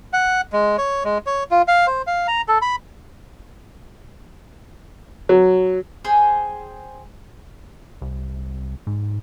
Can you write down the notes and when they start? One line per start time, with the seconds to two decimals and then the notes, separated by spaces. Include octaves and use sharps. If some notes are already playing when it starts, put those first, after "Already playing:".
0.13 F#5
0.53 G#3
0.78 C#5
1.04 G#3
1.26 C#5
1.51 F4
1.68 F5
1.87 C5
2.07 F5
2.28 A#5
2.48 A4
2.62 B5
5.29 F#3
6.05 G#4 C5 G5 G#5
8.02 C2
8.87 G#2